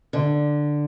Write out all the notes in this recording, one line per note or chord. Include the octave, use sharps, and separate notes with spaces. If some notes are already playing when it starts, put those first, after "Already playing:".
D3